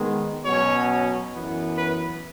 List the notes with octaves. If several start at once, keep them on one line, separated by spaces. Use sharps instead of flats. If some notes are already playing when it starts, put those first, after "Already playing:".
Already playing: D#3 G#3 B3
B2 F#3 C#4 C#5
F#2 E3 B3
B4